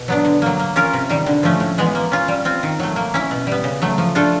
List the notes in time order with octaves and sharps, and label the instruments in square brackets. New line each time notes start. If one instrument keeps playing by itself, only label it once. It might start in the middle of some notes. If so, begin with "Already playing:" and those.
Already playing: [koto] B2
F#3 B3 D4
D3
F#3 A#3
A#3
C#4 F4 A#4
C3
D#3 G3
D3
F3 A3 C#4
A2
E3 G#3 B3
A#3
C#4 F4
G3
C4 F4
D#3
F#3 A3
A#3
C#4 E4
B2
G3 B3
C#3
F#3 A3
F3
A3 D4 F4 A4